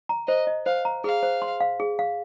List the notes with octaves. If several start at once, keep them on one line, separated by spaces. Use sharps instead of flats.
A#5
C5 D#5
D#5
C5 F5
A#5
G#4 F5
C5
C6
F5
G#4
F5